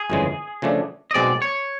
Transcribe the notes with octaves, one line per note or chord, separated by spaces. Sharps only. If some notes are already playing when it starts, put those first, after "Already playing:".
Already playing: G#4
G1 F2 C#3 E3 G#3
C#3 F3 A3 D4
D#5
B1 B2 G#3 C4 D5
C#5